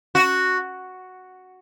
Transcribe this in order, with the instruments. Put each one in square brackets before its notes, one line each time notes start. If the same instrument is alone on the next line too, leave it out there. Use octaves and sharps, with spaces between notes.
[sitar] F#4